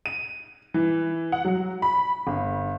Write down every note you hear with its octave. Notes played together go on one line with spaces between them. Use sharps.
D#7
E3
F#5
F#3
B5
G1